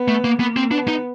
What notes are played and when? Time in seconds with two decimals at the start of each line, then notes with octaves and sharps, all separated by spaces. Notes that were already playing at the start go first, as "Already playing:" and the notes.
Already playing: B3
0.08 A3
0.24 A#3
0.40 A#3 B3
0.56 C4
0.71 B3 D4
0.88 D#4